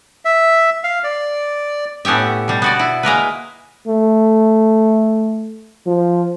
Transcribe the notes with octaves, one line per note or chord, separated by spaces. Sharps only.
E5
F5
D5
A2 B3 C#4 G4 E5
B2 G3
B3 F#4 D5
E4
G#3 A#3 A#4 B4
A3
F3